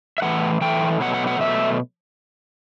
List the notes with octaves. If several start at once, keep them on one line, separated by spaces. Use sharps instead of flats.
E5
A2 E3 A3 F#5
A2 E3 A3 G5
B2 F#3 A3 F#5
F#5
F#5
B2 F#3 A3 E5